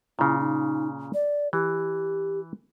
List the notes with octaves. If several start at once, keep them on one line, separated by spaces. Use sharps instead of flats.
A#2 C#3 E4
D#4
D5
E3 G4